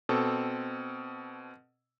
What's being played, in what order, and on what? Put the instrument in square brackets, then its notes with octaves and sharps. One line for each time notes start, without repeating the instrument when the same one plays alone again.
[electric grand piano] B2 C4 A4